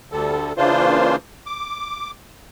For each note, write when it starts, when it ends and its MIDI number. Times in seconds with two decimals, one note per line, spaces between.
0.12 0.53 38
0.12 0.53 50
0.12 0.53 55
0.12 0.53 69
0.57 1.16 49
0.57 1.16 52
0.57 1.16 58
0.57 1.16 62
0.57 1.16 65
0.57 1.16 72
1.46 2.11 86